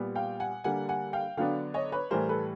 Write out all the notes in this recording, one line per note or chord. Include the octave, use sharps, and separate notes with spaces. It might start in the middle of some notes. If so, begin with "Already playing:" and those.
Already playing: A#2 G3 B3
F5 G5
F#5 G#5
D3 G3 A#3 F#5 G#5
F#5 G#5
F5 G5
D3 F#3 B3 D4 F5 G5
C#5 D#5
B4 C#5
A2 E3 G3 A#4 C5
A4 B4